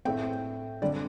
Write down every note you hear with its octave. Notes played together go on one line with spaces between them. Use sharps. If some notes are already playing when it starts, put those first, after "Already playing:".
A2 A3 C4 G5
D3 G3 C4 D5